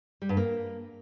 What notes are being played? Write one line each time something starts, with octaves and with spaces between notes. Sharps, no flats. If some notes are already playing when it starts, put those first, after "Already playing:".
G3
G2
A#3